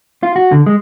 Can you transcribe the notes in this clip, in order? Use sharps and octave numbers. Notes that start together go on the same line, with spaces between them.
F4
F#4
D3
G#3